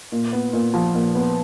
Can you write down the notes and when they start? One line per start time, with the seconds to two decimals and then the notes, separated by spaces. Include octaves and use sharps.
0.12 A#2
0.33 B3
0.53 A#2
0.74 F3
0.94 A#2
1.15 B3